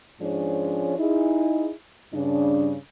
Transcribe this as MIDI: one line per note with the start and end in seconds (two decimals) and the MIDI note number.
0.21 0.95 44
0.21 0.95 53
0.21 0.95 61
0.21 0.95 62
0.21 0.95 68
0.21 0.95 73
0.98 1.72 63
0.98 1.72 64
0.98 1.72 68
2.14 2.75 43
2.14 2.75 49
2.14 2.75 62